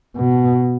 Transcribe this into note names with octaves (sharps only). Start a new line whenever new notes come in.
B2